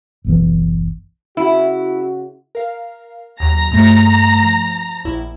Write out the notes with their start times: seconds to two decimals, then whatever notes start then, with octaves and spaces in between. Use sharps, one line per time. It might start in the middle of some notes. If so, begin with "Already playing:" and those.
0.24 F#1 B1 E3
1.37 C#3 E4 F#4
2.55 A#4 F5
3.40 D#2 F#3 A#5 A#6
3.71 G2 A3
4.42 F3
5.04 A#1 E4